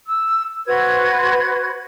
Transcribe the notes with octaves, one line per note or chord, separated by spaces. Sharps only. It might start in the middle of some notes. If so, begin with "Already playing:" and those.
E6
F#4 B4 C5 G#6